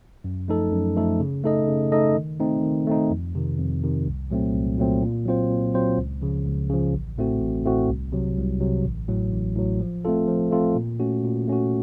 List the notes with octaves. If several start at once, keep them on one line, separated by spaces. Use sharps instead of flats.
F#2
F3 A3 D#4 A4
F#2
F3 A3 D#4 A4
C#3
A3 D#4 A4 D#5
C#3
A3 D#4 A4 D#5
D#3
A3 C4 D#4
D#3
A3 C4 D#4
F2
C3 D#3
F2
C3 D#3
C2
A#2 F#3 A3 C4
C2
A#2 F#3 A3 C4
A#2
F#3 C4 F4 C5
A#2
F#3 C4 F4 C5
C#2
C#3 F3
C#2
C#3 F3
A1
A2 A3 C4 F#4
A1
A2 A3 C4 F#4
C2
C3 F#3
C2
C3 F#3
A1
A2 F#3
A1
A2 F#3
F3
A3 C4 F4 A4
F3
A3 C4 F4 A4
A#2
A3 C#4 F#4
A#2
A3 C#4 F#4